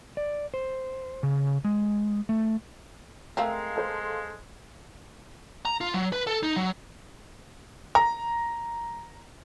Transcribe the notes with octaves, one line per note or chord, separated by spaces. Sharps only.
D5
C5
C#3
G#3
A3
G#3 A3 C4 A#4 F5
A4 C5 C6
A#5
F4
F#3
B4
A4
D#4
F#3
A#5